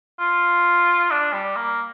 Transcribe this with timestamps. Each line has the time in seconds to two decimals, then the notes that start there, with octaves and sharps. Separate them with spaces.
0.20 F4
1.11 D4
1.33 G3
1.56 A#3